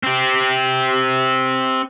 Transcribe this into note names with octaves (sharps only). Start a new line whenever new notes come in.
C4 G4